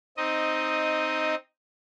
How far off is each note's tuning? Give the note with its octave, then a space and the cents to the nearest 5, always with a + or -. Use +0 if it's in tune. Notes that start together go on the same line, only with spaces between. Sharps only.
C4 +0 D#4 +0 D#5 +5